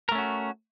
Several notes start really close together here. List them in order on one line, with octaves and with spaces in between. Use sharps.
A#4 A3 C#4 F#4